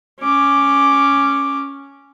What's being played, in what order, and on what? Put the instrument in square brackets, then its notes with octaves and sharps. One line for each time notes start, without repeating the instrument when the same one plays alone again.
[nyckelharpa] C#4 D6